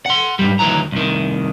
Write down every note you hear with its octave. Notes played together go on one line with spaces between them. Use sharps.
F#5 C6
G#2 C#3 G3
D2 D#3 E3 F#3 A#5
C2 D#3